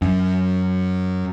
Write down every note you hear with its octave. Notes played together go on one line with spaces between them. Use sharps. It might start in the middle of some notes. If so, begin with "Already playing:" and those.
F#2